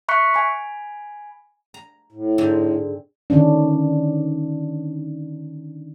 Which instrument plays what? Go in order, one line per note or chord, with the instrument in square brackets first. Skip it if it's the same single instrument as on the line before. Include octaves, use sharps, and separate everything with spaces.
[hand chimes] E5 B5 C#6 F#6 B6 C#7
G#5 B5
[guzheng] A#5
[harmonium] A2
[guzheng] G#2 D3 C4
[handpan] D3 D#3 C#4 D4